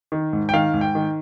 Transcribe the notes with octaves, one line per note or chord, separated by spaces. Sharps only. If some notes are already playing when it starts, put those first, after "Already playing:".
D#3
G#2
G5
D#3 F5
G#2
G5
D#3